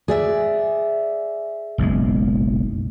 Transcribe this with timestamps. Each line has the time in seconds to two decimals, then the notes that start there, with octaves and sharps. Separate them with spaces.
0.08 G#4 D5 E5
1.78 F#1 B1 G#3